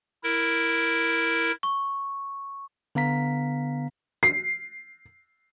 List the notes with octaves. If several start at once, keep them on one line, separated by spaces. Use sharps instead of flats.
E4 A#4
C#6
D3 B3 F5 A#5 B6
C7